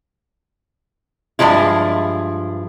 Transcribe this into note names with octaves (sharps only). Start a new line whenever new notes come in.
G2 A#2 F3 G#3 E4